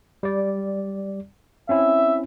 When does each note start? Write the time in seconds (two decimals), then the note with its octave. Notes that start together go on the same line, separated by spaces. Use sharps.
0.23 G3 D5
1.69 C4 C#4 E4 E5